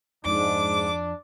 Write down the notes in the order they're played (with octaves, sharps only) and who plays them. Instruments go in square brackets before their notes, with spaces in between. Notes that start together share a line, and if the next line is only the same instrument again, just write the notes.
[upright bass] F2 [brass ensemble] G#2 [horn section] D4 [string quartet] D6